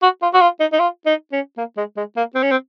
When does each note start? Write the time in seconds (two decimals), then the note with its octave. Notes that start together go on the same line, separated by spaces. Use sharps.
0.02 F#4
0.22 F4
0.34 F#4
0.41 F4
0.60 D#4
0.73 D#4
0.79 F4
1.06 D#4
1.32 C#4
1.58 A#3
1.77 G#3
1.97 G#3
2.17 A#3
2.35 C4
2.42 C#4
2.51 C4